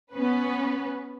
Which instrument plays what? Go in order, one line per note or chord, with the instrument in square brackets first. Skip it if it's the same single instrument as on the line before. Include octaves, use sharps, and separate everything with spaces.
[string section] B3 C#4 B4